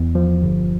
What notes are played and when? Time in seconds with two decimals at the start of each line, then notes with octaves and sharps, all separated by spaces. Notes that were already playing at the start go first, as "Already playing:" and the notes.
Already playing: E2
0.15 F3
0.42 G1